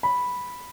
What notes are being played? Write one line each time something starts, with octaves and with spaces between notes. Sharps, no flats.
B5